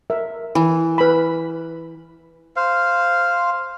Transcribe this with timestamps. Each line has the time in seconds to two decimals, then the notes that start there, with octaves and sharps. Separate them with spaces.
0.10 A#4 E5
0.55 E3
0.98 B4 B5
2.56 C5 F5